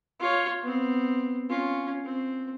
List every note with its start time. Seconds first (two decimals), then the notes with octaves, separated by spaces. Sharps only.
0.19 F4 C#5
0.62 B3 C4
1.49 C#4 F4
2.04 C4